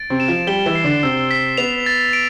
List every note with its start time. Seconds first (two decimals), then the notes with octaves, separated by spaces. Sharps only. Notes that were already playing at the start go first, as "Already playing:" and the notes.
Already playing: A6 D7
0.10 C3 C4
0.20 E7
0.28 F3 F4
0.47 G3 G4 G7
0.66 E3 E4
0.75 C7
0.84 D3 D4
1.03 C3 C4 E6
1.31 B6
1.57 B3 F7
1.86 A6
2.13 D7